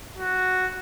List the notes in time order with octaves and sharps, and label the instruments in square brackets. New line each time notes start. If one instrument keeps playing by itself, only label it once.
[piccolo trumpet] F#4